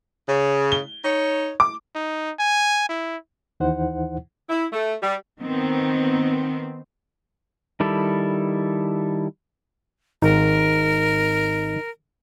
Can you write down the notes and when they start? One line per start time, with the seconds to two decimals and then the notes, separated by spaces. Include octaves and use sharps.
0.29 C#3
0.72 G7
1.05 D#4 C#5
1.60 D6
1.95 D#4
2.39 G#5
2.89 E4
3.60 D#2 E3 D#4 E4 C5 F#5
4.50 E4
4.73 A3
5.03 G3
5.40 D#3 B3 C4
7.80 D#3 G3 E4 A4
10.22 G#1 D#4 A#4